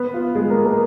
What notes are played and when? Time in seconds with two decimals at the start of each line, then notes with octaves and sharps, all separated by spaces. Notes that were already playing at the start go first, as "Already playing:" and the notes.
Already playing: B3 B4
0.14 F4
0.35 G#3 G#4
0.50 A#3 A#4
0.65 A#3 A#4